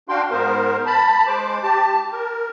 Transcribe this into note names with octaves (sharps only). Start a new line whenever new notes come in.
D4 F#4 F5 G5 C6
G#2 B3 A#4 C5
A5 B5
G#3 C5 D6
G4 A5
A#4